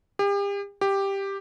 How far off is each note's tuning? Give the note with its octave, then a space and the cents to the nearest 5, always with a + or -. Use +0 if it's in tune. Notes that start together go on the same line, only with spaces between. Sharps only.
G4 +40
G4 +5